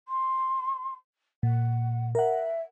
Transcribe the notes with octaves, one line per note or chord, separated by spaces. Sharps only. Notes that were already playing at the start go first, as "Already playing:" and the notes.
C6
A#2 F#5
A#4 E5 F#5